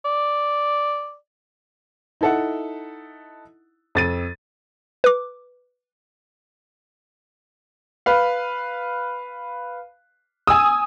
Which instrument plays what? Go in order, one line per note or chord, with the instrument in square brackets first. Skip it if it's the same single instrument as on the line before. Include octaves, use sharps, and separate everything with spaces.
[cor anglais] D5
[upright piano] D#4 E4 A4 E5 F#5
F2 A6 D#7
[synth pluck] B4 D6
[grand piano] B4 F5
[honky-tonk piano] G#5 D#6 [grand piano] E6